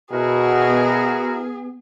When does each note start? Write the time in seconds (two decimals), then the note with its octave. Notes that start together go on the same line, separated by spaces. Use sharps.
0.12 B2 E4 F#4 G#4 A#4
0.67 B3